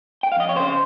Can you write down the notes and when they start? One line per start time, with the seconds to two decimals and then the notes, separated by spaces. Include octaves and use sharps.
0.23 G5
0.32 F5
0.36 F2 D#5
0.49 C#5
0.56 C#3 C5